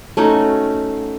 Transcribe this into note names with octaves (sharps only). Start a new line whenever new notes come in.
A3 C#4 D#4 F#4